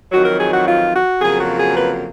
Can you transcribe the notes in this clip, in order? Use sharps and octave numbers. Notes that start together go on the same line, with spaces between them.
F2 D#3 F#3 F#4
A#4
G#4
F#4
F4
F#4
F2 C#3 F#3 A#3 G#4
F#4
G#4
B4